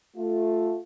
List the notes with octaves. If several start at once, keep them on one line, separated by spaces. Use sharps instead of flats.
A3 F4